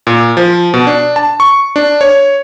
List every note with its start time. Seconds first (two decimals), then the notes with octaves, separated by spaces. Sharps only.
0.07 A#2
0.37 F3
0.74 B2
0.87 D4
1.16 A5
1.40 C#6
1.76 D4
2.01 C#5